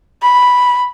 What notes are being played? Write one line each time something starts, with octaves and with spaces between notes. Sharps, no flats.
B5